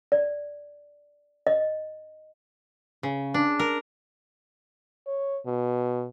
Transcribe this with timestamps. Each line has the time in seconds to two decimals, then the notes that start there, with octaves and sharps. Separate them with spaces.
0.12 D5
1.47 D#5
3.03 C#3
3.34 D4
3.59 A#4
5.07 C#5
5.46 B2